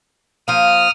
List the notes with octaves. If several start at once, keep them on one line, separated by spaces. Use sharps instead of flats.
F3 A#3 D#6 F6